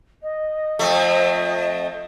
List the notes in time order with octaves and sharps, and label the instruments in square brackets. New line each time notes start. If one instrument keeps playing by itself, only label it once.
[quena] D#5
[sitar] F2 A3